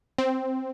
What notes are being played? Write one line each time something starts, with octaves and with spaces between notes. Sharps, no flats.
C4